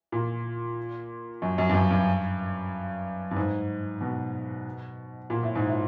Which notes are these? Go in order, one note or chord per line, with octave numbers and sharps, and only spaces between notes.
A#2
F#2
F#2
G2
F#2
G2
G2
G#2
B2
A#2
A2
G#2
A2